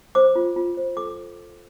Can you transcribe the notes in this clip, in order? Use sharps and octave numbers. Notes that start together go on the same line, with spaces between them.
C5 D6
F4
F4
C5
A4 D6